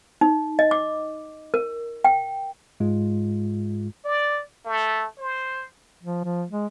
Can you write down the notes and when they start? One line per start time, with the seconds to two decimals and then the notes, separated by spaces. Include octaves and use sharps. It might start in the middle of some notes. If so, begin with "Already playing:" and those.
0.21 D#4
0.59 D#5
0.71 D6
1.54 A#4
2.04 G5
2.80 G#2 G#3 F4
4.05 D5
4.66 A3
5.19 C5
6.03 F3
6.24 F3
6.50 G#3